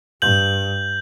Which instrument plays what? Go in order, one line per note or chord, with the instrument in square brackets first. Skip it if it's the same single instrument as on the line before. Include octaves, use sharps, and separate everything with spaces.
[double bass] G2 [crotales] G6 F#7